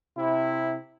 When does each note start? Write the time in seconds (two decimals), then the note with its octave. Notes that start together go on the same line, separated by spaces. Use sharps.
0.17 C3 E4